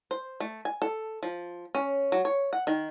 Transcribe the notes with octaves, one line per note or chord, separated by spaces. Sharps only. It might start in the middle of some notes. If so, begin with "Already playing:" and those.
C5
A3
G#5
A4
F3
C#4
F#3
C#5
F#5
D#3